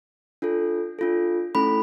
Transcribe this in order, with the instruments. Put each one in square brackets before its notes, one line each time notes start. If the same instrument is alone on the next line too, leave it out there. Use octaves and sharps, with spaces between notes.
[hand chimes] D4 F4 A4
D4 F4 A4
A3 C#4 E4 A4 B5